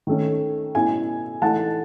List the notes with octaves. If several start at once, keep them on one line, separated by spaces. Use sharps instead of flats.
D#3 A3 C#4
B2 A3 C#4 E4 G#5
E3 A3 D#4 F#5 A5